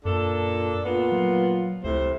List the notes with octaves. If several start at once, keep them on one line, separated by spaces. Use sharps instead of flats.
F#2 A#2 D4 A4
A#2 B3 F4
F#3
C#2 A2 C3 C5